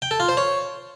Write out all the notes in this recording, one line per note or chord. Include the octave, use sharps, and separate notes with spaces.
G5
A4
F4
C5
C#5